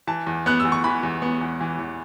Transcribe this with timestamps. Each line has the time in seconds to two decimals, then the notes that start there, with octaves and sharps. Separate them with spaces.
0.07 E3 A5
0.27 E2
0.46 B3 F#6
0.60 E6
0.65 E2
0.72 C#6
0.84 E3 B5
1.03 E2
1.22 B3
1.41 E2
1.61 E3
1.79 E2